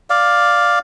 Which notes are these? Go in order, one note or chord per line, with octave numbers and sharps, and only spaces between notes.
D5 F5